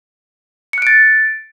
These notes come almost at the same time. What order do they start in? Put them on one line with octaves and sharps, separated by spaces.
C#7 F#6 D7 A6